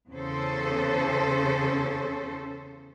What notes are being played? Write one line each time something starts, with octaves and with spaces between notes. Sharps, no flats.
E2 C#3 C#4 A4 C5